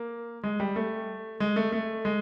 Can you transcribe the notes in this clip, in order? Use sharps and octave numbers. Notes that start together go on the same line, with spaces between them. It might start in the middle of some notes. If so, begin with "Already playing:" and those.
Already playing: A#3
G#3
G3
A3
G#3
A3
A3
G#3